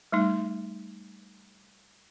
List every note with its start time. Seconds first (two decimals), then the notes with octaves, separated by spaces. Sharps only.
0.12 G3 A3 D#4